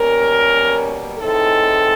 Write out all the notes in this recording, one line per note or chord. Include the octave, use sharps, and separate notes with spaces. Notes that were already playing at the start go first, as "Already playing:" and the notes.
Already playing: B2 G3 A#3 C#4 A#4
A2 E3 G#3 C4 D#4 A4